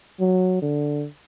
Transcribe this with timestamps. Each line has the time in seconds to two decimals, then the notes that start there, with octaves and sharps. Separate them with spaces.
0.20 F#3
0.62 D3